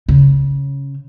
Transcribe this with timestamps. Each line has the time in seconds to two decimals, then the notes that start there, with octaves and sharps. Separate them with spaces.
0.08 C#3